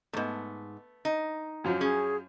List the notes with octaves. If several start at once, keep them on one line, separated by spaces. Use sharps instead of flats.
F2 G#2 A3 B3
D#4
F#2 F3 F#3
C#4 G#4